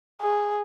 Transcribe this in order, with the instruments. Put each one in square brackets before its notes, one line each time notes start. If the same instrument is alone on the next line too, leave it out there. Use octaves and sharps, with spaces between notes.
[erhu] G#4